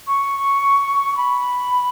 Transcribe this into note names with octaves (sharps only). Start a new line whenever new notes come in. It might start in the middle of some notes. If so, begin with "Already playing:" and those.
C#6
B5